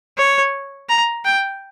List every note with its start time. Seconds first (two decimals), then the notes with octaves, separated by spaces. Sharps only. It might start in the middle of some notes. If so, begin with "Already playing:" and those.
0.18 C#5
0.89 A#5
1.25 G5